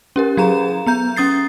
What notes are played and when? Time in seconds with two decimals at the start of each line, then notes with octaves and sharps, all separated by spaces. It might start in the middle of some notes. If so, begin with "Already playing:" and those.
0.16 C#4 G4 A#4
0.37 F#3 G#4 A#5 E7
0.86 B3 A#5 G6
1.16 C#4 D#6 A6 C7